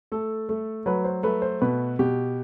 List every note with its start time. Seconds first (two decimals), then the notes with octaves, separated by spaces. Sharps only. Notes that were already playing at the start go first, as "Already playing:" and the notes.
0.12 A3 A4
0.49 A3
0.86 F#3 B4
1.04 C5
1.23 A3 B4
1.42 C5
1.62 B2 B4
1.99 B2 G4